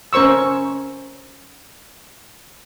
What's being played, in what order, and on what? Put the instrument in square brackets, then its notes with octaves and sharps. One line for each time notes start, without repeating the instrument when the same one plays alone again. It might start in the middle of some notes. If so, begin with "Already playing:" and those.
[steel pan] C#4 A#4 C5 C#6 E6